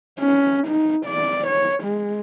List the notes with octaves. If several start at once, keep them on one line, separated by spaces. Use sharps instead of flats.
C#4
D#4
D5
C#5
G#3